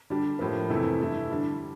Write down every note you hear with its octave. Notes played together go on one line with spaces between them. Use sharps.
D3 G3 D4 G4
A2 F3 A#3
F2 C3 E3 A3 E4
G2 E3 A3 E4
D3 G3 D4